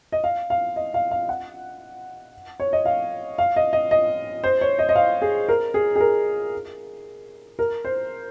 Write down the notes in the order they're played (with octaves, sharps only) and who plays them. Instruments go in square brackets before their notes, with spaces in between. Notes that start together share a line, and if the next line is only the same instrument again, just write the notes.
[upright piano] D#5
F5
F5
D#5
F5
F5
F#5
C#5
D#5
F5
F5
D#5
D#5
D#5
C5
C#5
D#5
D#5
F5
G#4
A#4
G#4
G#4
A#4
A#4
C5